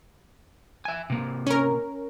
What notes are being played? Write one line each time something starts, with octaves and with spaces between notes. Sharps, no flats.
E5 G#5
C3 A#3
C#4 A#4